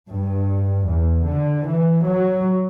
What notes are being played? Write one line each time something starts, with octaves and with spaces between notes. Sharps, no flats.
G2
E2
D3
E3
F#3